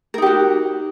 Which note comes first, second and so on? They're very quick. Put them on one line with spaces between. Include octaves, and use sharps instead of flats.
A#4 D#4 G4 F#4